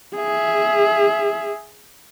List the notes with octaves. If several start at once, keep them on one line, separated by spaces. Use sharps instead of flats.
G#4 E5